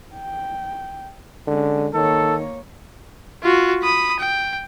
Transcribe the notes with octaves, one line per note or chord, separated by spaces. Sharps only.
G5
D3 G#3 C#4
D#3 A#3 A4 C#5
F4 F#4
B5 D#6
G5